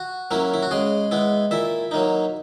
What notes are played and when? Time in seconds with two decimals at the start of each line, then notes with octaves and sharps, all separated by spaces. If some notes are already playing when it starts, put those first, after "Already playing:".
Already playing: F#4
0.31 F#3 A#3 C#4 E4
0.54 E4
0.63 F#4
0.71 C#3 G#3 G#4
1.11 G#3 B3 E4
1.51 A#2 E4 E5
1.91 F#3 A#3 D#4